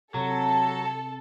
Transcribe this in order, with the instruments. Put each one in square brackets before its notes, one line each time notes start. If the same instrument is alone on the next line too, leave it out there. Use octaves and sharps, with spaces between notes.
[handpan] C3 [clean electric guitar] F#3 [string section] A4